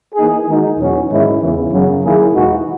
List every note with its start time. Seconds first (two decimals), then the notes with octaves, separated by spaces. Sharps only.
0.15 E3 A#3 D#4 G#4
0.46 D#3 G#3 D#4 F#4
0.78 E2 B2 F#3 C#4 F#4
1.09 G#2 D#3 G#3 C#4 E4
1.40 E2 C#3 E3
1.71 F#2 C#3 F#3
2.02 D#3 A#3 E4 G#4
2.33 E2 B2 G#3 D#4 F#4